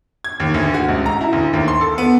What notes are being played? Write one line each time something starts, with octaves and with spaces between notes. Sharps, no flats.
G#6
D#2
D2
F#4
C#2
A#5
E4
D2
D#2
C6
A4
B3